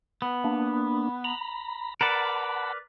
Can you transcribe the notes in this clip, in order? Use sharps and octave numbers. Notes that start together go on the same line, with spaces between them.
B3
A#3 D4
A#5 B5
A#4 B4 D5 F#5 A5 B5